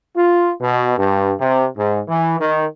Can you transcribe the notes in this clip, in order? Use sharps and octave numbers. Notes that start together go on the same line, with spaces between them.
F4
B2
G2
C3
G#2
E3
D#3